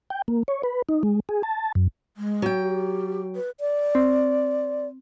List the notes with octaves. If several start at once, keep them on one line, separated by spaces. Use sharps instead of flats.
G5
A#3
C#5
B4
D#4
G#3
G#4
A5
F#2
G#3
F#3 G5
G4
B4
D5
C4